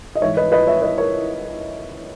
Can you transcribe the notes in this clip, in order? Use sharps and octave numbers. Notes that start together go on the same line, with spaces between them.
D#5
G#2 E3 C#5 E5
B4 D#5
B4 D#5
C#5 E5
B4 D#5
A#4 C#5